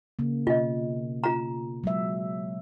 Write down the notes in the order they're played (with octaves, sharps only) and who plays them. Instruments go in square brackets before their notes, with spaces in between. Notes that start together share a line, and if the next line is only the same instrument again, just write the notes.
[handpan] C#3 A#3
[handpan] B2 [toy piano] F4 D#5
[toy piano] F4 A#5
[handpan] F#3 G#3 E5